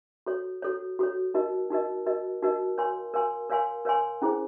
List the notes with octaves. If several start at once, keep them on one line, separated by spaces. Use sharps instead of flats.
F#4 A4 C#5
F#4 A4 C#5
F#4 A4 C#5
D#4 F#4 A#4 D#5
D#4 F#4 A#4 D#5
D#4 F#4 A#4 D#5
D#4 F#4 A#4 D#5
A#4 C#5 F5 G#5 C6
A#4 C#5 F5 G#5 C6
A#4 C#5 F5 G#5 C6
A#4 C#5 F5 G#5 C6
C#4 E4 G#4 C5